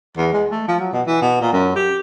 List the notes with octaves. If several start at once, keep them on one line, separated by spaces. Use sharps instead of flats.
E2
G#3
A3
F3
F#3
B2
E3
B2
A#2
F#2
G4